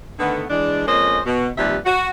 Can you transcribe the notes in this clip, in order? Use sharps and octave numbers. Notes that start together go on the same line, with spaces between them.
D3 D#3 A3 B3
E3 G#3 D4
F2 G#3 A#3 C#4 C5 D#5
B2
D#2 C3 F3 G3 B4 E5
F#4